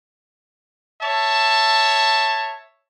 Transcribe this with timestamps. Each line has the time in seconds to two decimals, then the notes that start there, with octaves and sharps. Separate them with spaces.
1.02 C#5 E5 A5